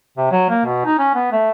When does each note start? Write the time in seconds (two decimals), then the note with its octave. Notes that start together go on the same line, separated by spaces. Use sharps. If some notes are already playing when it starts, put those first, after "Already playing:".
0.17 C3
0.31 F#3
0.50 A#3
0.66 B2
0.85 D#4
0.99 C#4
1.15 B3
1.32 A3